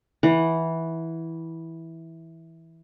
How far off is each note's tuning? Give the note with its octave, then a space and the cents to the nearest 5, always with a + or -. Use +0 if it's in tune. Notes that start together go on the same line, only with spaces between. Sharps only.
E3 -10 F#5 +0